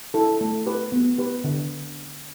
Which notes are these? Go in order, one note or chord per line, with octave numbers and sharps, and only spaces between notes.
E4 A4
A3
G4 B4
B3
G4 B4
D3